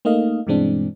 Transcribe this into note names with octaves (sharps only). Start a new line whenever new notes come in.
A3 A#3 D#4 D#5 F5
G2 B2 E3 G#3 C4 D4